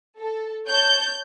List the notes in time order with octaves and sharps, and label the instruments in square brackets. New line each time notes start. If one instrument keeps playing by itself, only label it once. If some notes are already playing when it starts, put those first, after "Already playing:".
[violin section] A4
[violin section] C#5 A5 [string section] G6